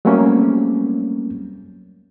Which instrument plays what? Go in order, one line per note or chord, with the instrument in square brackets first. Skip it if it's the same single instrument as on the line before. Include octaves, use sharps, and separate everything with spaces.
[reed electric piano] F#3 G3 A3 A#3 C4 C#4